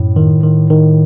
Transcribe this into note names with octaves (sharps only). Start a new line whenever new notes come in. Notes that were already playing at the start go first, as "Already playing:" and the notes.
Already playing: F#2 A2
D#3
D#3
D#3